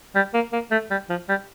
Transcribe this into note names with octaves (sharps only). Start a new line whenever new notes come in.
G3
A#3
A#3
A3
G3
F3
G3